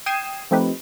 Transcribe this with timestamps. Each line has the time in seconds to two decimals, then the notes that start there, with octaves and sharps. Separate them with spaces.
0.06 G5 D#6 G#6 C7 D#7 E7
0.51 F3 A3 C4 D#4 G4 B4